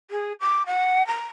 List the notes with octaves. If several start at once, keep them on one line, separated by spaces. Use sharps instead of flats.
G#4
D6
F#5
A#5